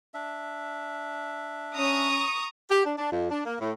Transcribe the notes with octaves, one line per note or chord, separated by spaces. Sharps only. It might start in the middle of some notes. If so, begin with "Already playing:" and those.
D4 E5
C#4 A#5 C#6 D#6
G4
D4
D4
F2
D4
A#3
A2